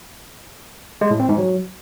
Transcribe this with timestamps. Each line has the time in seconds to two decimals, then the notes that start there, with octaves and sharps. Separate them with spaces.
1.01 G#3
1.11 A2
1.20 C4
1.29 G#2
1.38 F#3